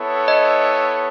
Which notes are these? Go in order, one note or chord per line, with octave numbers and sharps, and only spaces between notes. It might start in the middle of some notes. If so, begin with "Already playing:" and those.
Already playing: B3 E4 A4 C#5
D#5